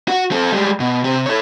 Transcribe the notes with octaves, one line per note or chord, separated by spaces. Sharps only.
F#4
C4 A4
G3 G#3
B2
C3 C4
A4 C#5